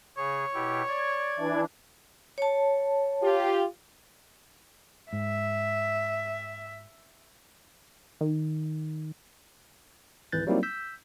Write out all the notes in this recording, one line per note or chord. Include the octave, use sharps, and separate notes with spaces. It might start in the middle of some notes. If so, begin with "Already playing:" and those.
C#3 G#4 C#5
B2 E4 G4
D5 G#6
E3 D4
C#5 A5
F4 G4
G#2 E5
D#3
G#1 C#2 E3 F#6 G6 A6
F#3 G3 A#3 C4 D#4 E4
E6 G6 B6